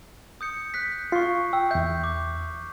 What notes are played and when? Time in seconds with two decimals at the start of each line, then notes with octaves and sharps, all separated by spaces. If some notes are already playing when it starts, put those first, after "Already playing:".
0.41 D#6 G6 C#7
0.74 F#6 G6 B6
1.12 F4 C#6 C7
1.53 G5 E6
1.71 E2 E5 G6
2.04 D6